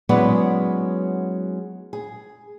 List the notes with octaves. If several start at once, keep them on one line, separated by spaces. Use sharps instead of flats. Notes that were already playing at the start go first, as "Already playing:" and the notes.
F#3 G#3 B3 C#4 E4 D5
G#4